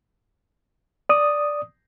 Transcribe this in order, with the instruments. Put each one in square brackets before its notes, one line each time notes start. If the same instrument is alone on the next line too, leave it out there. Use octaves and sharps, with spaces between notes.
[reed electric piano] D5 D#6